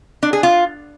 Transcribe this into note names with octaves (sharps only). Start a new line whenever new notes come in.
D4
G#4
F4